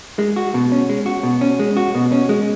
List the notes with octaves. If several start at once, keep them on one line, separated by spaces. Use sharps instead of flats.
G#3
F#4
B2
C#4
G#3
F#4
B2
C#4
G#3
F#4
B2
C#4
G#3